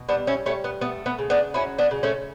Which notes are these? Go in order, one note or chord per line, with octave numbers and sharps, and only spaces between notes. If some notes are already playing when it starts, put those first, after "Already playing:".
Already playing: B2
G3 B3 D4
C#4 E4
G3 A3 C#4
B3
A3 B3
B3
C#3
B3 D4
F#3 C#4 E4
B3 D4
C#3
A3 C#4